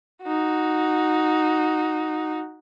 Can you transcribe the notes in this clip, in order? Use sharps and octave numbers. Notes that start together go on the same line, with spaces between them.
D#4 F#4